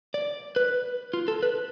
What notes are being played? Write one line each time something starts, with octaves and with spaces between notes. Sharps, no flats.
D5
B4
F4
A4
B4